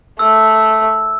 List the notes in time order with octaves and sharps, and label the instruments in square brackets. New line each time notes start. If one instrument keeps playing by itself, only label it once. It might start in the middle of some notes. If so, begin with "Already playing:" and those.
[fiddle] A3 [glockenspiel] E6